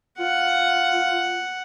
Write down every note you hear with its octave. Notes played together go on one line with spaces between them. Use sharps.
F4 F#5